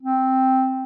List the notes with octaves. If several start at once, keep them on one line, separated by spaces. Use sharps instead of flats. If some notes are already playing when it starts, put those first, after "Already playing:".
C4